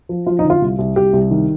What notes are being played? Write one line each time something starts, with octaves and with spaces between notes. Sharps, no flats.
F3
F3 F4
D#4
D3
F4
C2
C2
C2 G4
C2
D#3